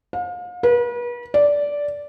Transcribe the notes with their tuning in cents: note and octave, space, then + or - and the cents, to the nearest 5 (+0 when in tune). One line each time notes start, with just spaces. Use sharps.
F5 +40
B4 -40
D5 -10